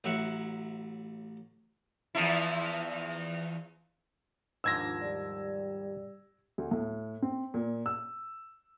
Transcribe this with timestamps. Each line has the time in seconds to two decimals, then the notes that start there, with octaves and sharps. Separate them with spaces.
0.04 A1 F#3 E5 F#5
2.15 E2 F3 E4
4.64 D#2 G#2 F3 D4 F4 E6 G#6 A#6
5.01 G3 D5
6.58 D2
6.71 A2
7.22 C4
7.54 A#2
7.86 E6